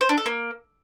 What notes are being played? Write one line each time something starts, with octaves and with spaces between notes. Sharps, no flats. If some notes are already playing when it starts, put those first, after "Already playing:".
C5
D4
A4
A#3